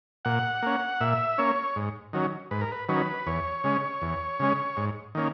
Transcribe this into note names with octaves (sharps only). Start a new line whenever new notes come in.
A#2 F#5
A#3 C#4
A#2 E5
A#3 C#4 C#5
G#2
D#3 F#3 C#4
G#2 B4
A#4
B4
D#3 F#3 C#4 B4
E2 C#5
C#3 G#3 C#4
E2
C#3 G#3 C#4
G#2
D#3 A#3 C#4